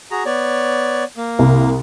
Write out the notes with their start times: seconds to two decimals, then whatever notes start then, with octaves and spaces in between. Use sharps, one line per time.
0.11 F#4 G#4 A#5
0.25 B3 C#5 D5
1.17 A#3
1.39 C2